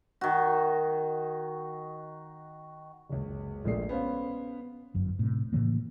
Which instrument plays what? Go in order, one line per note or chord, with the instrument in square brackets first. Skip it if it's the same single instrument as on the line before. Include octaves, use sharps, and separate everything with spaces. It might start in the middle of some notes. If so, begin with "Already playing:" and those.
[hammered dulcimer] D#3 F#4
[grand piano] F#1 C#2
A#1 A#2 G#3 A3 D5 C7
B3 C#4 C5 F5
[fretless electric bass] G1 F#2
A2 C3
A2 C#3 E3 A#3